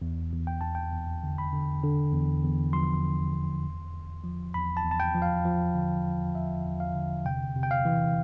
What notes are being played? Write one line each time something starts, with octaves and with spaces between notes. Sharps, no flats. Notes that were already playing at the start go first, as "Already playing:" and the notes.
E2
E2
G5
E2 A5
G5
E2
D3
B5
D3
D3
E2
E2
F3 C6
D3
E2
E2
E2
F3
E2 B5
A5
E2
A5
G5
F3
F5
F3
D3
E2
E2 E5
E2
F5
D3
C3 G5
C3
G5
F5
E3